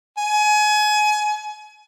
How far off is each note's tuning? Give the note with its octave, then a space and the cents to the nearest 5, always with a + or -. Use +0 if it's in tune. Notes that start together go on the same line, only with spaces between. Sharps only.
G#5 +30